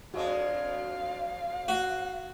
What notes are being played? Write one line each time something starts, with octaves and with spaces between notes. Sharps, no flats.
F2 G#3 D4 F#4 D#5 F5
F#4